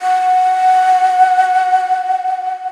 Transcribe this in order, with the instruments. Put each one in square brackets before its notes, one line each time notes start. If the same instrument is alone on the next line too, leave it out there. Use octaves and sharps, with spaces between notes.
[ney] F#5